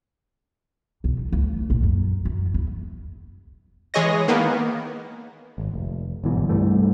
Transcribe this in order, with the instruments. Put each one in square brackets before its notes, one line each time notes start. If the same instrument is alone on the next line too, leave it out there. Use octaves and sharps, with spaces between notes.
[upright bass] B1
D#4
D2
A#1
F#2
F#2
E2
[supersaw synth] E3 G#3 G#4 C#5 D#5 A#6
D#3 A#3 B3
[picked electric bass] G#1
F1
G1 G#2 B2 E3
C2 G2 G3 A3